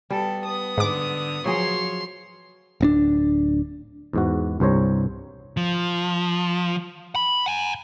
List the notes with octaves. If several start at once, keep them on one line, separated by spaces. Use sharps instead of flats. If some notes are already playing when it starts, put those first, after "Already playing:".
G3 B3 A4
B3 D#6
G#2 D3 D6
F3 F#3 G#4 C#5 C6
D1 C4 D4
E2 G#2 F#4
C2 G2 C5 C#5 A#5
F3
B5
F#5 G#5